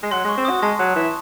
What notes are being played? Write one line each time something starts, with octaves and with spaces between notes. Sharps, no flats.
G#3
F#3 C6
G#3
C#6
C4
D#6
F#4
G#3 A5
F#3
E3